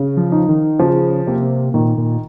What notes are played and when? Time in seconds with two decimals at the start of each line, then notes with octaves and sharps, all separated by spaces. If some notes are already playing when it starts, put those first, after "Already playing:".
Already playing: C#3
0.17 F3
0.32 D#4
0.49 D#3
0.79 C#3 F3
1.27 C3 A#3
1.74 A#2 D#3
1.98 A#2